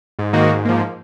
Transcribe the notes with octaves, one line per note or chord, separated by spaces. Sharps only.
G#2
D#3 A#3 D#4 F#4
G#2
F3 A#3